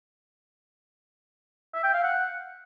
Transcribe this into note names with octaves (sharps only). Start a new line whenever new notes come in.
E5
G5
F5
F#5